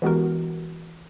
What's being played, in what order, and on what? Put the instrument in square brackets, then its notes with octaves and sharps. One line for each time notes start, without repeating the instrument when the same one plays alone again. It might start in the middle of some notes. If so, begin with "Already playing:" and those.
[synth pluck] E3 G#3 B3 F#4 G4 A#4